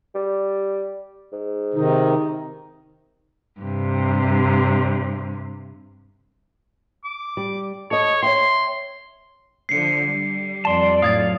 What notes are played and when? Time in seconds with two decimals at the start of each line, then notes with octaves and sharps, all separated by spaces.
0.15 G3
1.32 G#2
1.74 C3 D#3 D#4
3.60 G2 C3
7.05 D6
7.37 G3
7.91 A4 C#5 D#5
8.23 C#5 E5 G5 C6
9.69 D3 F3 C7 C#7
10.06 G3
10.65 F2 D5 A5 C6
11.02 A2 F#3 F5 D#6 G#6 A6